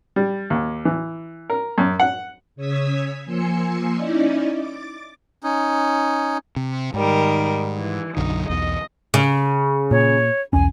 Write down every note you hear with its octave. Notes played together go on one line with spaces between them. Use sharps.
G3
D#2
E3
A#4
F#2
F#5
C#3 C#5 D#6 E6 G#6 B6
F3 A#3 G#5 C6 E6 C#7
C#4 D#4 E4 D5 D#5
D6 A6
C#4 D#4
C3
G#2 D#3 G3 A#4
E3
B1 F#2 D3 D#4
B1 E2 D#5
C#3
A#2 C#5
B1 E2 C#4 G#5